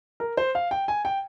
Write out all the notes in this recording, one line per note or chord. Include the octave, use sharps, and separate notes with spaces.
A#4
C5
F5
G5
G#5
G5